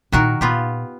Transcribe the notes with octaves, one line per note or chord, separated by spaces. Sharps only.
A#2 D#3 E4 F#4 A#4
A#2 B3 F4 G4